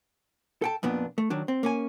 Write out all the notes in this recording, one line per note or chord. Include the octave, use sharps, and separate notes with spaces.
A4 G5 A5
F2 A#2 B3 D4
A3
D#3 F#3 D4
C4
A#3 C#4 G#5